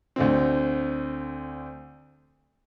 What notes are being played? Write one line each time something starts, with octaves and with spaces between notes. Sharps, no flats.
D2 D3 C4